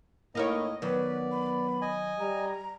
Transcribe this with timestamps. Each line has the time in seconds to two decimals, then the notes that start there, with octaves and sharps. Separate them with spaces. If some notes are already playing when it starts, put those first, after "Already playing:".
0.35 A2 A#3 D#4 E4 A#4 C#5 D#5
0.82 D#3 F#3 B3 B4 D5
1.32 B5
1.82 D#5 G#5
2.20 G3 A#5